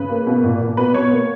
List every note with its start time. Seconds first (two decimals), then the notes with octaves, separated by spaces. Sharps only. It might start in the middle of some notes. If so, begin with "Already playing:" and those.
Already playing: C#3 B4
0.10 A#3
0.27 B2
0.44 A#2
0.61 A#2
0.77 B2 B4
0.94 B2 C#5
1.11 A#3